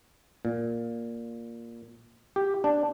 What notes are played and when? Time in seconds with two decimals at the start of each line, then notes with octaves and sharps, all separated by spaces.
0.45 A#2
2.36 G4
2.64 D4